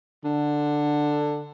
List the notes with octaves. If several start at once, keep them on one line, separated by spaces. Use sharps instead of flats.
D3